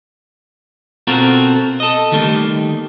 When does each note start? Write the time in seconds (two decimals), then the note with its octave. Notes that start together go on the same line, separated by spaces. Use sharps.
1.07 B2 C4 F4 F#4 A4 A#4
1.80 A4 D#5
2.12 D#3 G3 A3 A#3